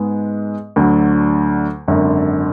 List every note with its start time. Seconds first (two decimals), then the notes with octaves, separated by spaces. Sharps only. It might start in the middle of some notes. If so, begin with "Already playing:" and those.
Already playing: G#2 G#3 B3
0.76 D2 D3 F#3
1.88 G#1 F#2 D3